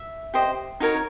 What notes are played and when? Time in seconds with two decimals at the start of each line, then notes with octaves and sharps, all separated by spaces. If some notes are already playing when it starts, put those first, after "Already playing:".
Already playing: E5
0.34 G4 C5 D#5
0.80 D#4 F#4 A#4 C#5